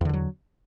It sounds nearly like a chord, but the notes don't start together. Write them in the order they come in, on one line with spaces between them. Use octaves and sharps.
E2 D3 E3 F#3